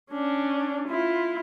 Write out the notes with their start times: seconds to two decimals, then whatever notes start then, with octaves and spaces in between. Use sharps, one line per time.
0.11 C#4 D4
0.88 E4 F4